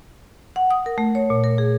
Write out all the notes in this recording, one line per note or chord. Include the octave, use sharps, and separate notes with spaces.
F#5
D#6
A#4
A3
C#5
A#2
A#4
G#4